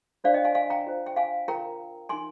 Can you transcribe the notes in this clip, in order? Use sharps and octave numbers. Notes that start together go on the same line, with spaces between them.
D4 F4 C5 D5 F5
D#5 G5
F5 G#5
F5 G#5
G5 A#5
F4 C5
G5
F5 G#5
F4 A#4 G5 A#5
D#4 A#4 G#5 C6